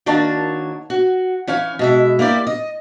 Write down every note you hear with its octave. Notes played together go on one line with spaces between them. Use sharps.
D#3 A#3 D4 F#4 C#5 A5
F#4
E3 C#4 F5 G#5
B2 G#3 E5
A#3 E4 G4 D5
D#5